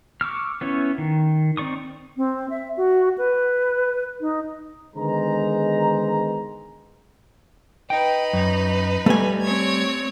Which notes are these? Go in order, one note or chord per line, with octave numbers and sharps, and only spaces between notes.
C#6 D6 E6 F6
B3 C#4 E4 C#5
D#3
C4 D#4 D5 C#6 D#6
C4
E5
F#4
B4
D#4
D3 D#3 G#3 B3 C5 A#5
D#4 B4 G5
F#2
G3 A3 G#5
C4 C#5 G#6